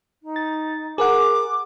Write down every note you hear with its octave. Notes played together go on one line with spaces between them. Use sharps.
D#4
A6
G#4 A#4 F#5 D6